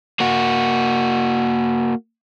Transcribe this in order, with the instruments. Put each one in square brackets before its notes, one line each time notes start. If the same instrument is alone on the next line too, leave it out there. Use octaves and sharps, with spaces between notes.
[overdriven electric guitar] A#3 F#4